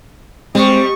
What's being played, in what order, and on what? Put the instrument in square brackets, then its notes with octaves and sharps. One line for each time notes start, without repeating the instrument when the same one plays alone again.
[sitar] G3 [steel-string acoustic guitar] G#3 [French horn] C4 [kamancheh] D#5 C#6